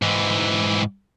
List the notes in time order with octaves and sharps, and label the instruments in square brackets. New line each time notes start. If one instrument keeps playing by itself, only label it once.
[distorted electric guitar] G#2 E3